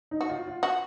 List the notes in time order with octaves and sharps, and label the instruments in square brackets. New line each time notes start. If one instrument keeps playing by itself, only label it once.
[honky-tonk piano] D#4
[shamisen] F#4
[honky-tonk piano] F4
F4
[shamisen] F#4